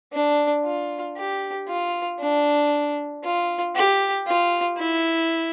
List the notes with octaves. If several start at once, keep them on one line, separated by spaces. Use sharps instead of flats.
D4
F4
G4
F4
D4
F4
G4
F4
E4